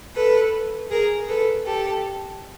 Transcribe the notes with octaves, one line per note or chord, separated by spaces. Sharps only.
A4 B4
G#4 A#4
A4 B4
G4 A4